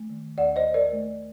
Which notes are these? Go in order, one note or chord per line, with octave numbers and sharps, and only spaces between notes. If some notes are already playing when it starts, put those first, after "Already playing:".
Already playing: A3
D#3
D#2 D5 F#5
C5 D#5
D#2
A#4 D5
A3